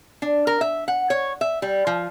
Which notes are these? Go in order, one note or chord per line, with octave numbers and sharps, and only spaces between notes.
D4
A#4
E5
F#5
C#5
E5
G3
F3